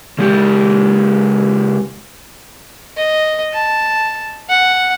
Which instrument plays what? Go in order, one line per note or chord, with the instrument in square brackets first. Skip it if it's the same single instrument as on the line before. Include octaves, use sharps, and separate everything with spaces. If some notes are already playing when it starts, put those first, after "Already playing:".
[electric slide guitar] C#3 G#3 G4
[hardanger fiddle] D#5
A5
F#5